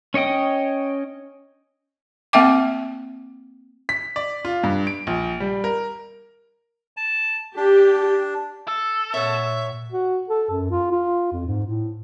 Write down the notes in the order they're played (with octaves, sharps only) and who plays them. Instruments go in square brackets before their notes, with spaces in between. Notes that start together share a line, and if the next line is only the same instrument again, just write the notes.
[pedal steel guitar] C#4 C#5 D#5 G5 D#6
[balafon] A#3 C4 E5 G5 D6
[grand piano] B6
D5
F4
G2
D7
A#1
G3
A#4
[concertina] A5
[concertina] D4 [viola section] G4
[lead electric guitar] A4
[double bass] A#2 [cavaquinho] C#5 F#5 [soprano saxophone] E5
[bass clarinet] F#4
A4
F#2
F4
F4
F2
G#2
A2